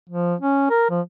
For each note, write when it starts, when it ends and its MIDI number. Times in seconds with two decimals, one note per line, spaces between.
0.10 0.35 53
0.41 0.70 61
0.70 0.89 70
0.90 1.01 53